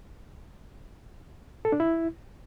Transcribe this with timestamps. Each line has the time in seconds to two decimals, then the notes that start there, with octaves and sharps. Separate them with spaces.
1.65 A4
1.72 D4
1.80 E4